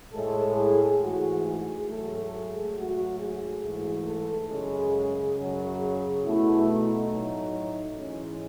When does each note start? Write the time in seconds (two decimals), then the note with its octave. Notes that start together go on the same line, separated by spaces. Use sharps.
0.14 A2 G#3 A4
0.58 G#4
1.01 G#2 E3 A3 F#4
1.45 G#4
1.88 G#2 F#3 A3 A4
2.31 G#4
2.75 G#2 F#3 A3 F#4
3.19 G#4
3.62 G#2 E3 A3
4.05 A4
4.50 F#2 C#3 G#3 G#4
5.37 F#2 C#3 F#3 G#4
6.23 B2 E4
6.28 A3
6.68 D#4
7.10 A2 F#3 A3
7.97 G#2 E3 G#3 C#4